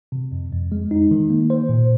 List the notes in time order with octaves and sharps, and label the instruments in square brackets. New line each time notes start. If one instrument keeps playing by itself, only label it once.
[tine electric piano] C3
F2
F2
G#3
D#4
D#3
A#3
C5
A#2